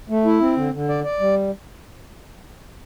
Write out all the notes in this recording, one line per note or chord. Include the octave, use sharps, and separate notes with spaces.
A3
E4
C4
D3
D3
D5
D5
G3